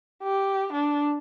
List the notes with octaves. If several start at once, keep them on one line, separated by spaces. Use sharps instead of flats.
G4
D4